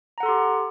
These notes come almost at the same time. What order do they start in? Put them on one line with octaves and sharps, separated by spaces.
A#5 F#5 A4 C6 G4